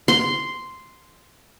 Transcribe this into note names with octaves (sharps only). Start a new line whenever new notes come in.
C6